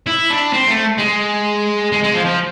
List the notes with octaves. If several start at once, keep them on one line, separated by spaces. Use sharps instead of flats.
E4
D4
C4
A3
G#3
G#3
G#3
F3
F3